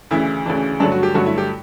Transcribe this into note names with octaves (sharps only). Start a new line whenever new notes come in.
D2 C#3 E3 E4
D2 C#3 E3 D4
G2 D3 F#3 A3 D4
F#4
G4
G2 D3 F#3 A3 F#4
E4
G4